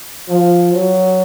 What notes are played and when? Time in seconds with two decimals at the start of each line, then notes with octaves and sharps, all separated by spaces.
0.29 F3
0.73 F#3